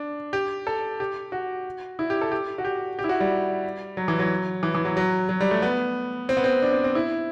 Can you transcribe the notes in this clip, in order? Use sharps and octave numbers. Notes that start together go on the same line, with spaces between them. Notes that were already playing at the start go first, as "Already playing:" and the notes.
Already playing: D4
G4
A4
G4
F#4
E4
G4
A4
G4
F#4
G4
G4
E4
F#4
G3
F#3
E3
F#3
E3
E3
F#3
F#3
F#3
G3
A3
B3
C4
B3
C4
D4
C4
C4
E4